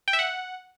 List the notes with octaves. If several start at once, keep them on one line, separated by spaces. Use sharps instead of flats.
G5
E5
F#5